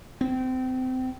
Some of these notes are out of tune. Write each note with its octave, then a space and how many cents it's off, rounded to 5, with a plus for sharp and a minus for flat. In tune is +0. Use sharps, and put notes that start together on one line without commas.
C4 -30